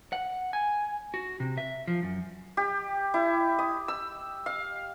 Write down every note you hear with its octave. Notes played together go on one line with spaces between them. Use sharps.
F#5
G#5
F#4
C3
E5
F3
F#2
G4
E4
D#6
E6
F5